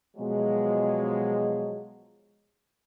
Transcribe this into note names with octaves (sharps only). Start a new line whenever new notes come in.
B2 F3 F#3 G#3